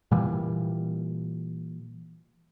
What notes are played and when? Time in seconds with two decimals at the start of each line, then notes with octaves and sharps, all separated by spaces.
0.11 A#2 E3 G3